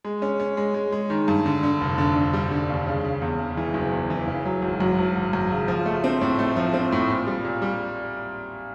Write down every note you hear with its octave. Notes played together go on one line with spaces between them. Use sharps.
G#3
C#4
C#4
G#3
G#3
G#3
D#3
G2
D3
D3
F1
D3
D3
G3
D3
D#2
C#3
C#3
E2
C#3
E3
F#1
E2
E3
C#3
F#3
G#1
F#2
G#1
G#1
F#2
C#3
F3
A3
C4
A2
A3
F3
C4
A2
A#2
G3
A#2
G3